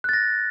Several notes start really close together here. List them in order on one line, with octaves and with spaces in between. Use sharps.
F#6 A6 A#6